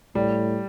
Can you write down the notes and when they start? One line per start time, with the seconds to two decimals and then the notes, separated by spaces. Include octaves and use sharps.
0.15 A2 G3